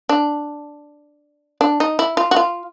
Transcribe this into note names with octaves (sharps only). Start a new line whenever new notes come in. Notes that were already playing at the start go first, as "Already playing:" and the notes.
D4
D4
D#4
E4
F4
F#4
F4